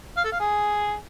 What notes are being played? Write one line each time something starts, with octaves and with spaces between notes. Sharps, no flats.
F5
A4
F5
G#4